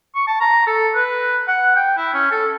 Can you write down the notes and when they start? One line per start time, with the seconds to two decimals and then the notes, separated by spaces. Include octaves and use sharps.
0.15 C#6
0.27 A5
0.41 A#5
0.67 A4
0.95 B4
1.48 F#5
1.76 G5
1.97 E4
2.14 C#4
2.31 A4